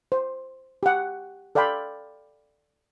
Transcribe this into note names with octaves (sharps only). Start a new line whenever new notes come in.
C5
G4 F#5
A4 D5 F5 G5 B5 C6